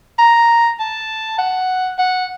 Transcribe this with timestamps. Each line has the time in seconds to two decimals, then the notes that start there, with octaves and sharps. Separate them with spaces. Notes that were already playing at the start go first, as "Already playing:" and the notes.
0.18 A#5
0.79 A5
1.38 F#5
1.99 F#5